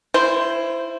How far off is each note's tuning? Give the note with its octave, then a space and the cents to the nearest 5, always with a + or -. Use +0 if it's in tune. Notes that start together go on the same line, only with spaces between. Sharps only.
E4 +20 C5 +0